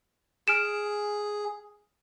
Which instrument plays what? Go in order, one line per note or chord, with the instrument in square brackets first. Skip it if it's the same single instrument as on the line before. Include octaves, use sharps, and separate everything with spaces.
[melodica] G#4 [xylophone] F6 D7 E7